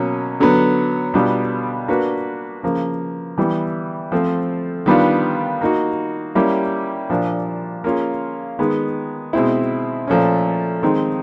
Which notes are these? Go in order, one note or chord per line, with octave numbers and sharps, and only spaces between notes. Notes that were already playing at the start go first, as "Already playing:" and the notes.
Already playing: B2 F#3 A#3 C#4
D3 F#3 B3
B2 G3 B3 D4 F4
A#3 D4 F#4 B4
C#3 F3 A#3
E3 G3 B3 E4
F3 A3 C4
D#3 G3 B3 D4 F4
A#3 D#4 F#4
G3 A#3 C#4 E4 G4
A#2 F3 A#3 D4
A#3 C#4 F4 G#4
D#3 G#3 B3
B2 G#3 C4 E4
A#2 F3 A3 C#4
D#3 G#3 C4 D#4